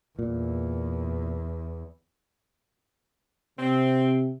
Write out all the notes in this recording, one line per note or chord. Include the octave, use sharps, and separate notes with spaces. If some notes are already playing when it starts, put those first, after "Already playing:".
E2 A#2
C3 C4